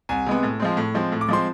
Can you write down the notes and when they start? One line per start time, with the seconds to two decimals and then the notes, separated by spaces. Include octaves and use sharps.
0.09 C2 G#5
0.26 C3 G#3 B3
0.43 A2
0.60 F3 G#3 C4
0.77 A2
0.94 F3 G#3 C4
1.12 A2
1.21 D6
1.28 F3 G#3 C4 C6